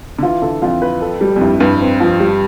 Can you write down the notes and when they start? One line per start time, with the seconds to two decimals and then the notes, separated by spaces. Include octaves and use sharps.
0.19 D3
0.23 E3 F4
0.42 D3 A4
0.62 F2 F4
0.82 B4
1.01 A4
1.21 G3
1.36 F2
1.41 G2 E4
1.60 G2 B4
1.80 C4
2.00 F3
2.20 G3